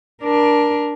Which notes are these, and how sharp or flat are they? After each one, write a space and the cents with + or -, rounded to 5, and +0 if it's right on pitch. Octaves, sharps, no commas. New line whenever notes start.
D4 +0 A#4 +20